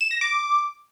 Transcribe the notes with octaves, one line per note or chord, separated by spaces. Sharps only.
E7
A#6
D6